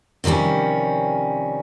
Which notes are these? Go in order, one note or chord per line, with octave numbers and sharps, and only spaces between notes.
C3 D#3 F3 G3 C#4